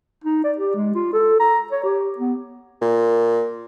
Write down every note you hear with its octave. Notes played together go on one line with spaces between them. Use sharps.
D#4
D5
G4
G#3
F4
A4
A#5
C#5
G4
B3
A#2